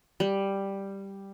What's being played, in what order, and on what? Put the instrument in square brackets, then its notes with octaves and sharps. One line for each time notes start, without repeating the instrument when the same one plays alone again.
[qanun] G3